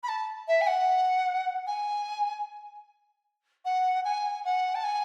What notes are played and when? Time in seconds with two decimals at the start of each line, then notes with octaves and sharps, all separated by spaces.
0.03 B5
0.08 A5
0.48 E5
0.61 G#5
0.67 F#5
1.67 G#5
3.65 F#5
4.04 G#5
4.45 F#5
4.75 A5
4.84 G#5